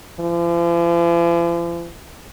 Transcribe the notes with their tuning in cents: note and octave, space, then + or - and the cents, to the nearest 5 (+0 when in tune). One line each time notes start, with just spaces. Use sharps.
F3 -45